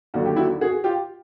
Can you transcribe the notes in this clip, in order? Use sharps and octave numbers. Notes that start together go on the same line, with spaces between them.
D#2 D3 F#3 F#4
G4
E4 F#4
F#4 G#4
F4 G4